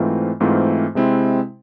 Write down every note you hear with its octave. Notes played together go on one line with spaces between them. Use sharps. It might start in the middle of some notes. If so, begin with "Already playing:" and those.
Already playing: G#2 E3 A3 C4 F4
G#2 E3 A3 C4 F4
C3 G#3 C4 E4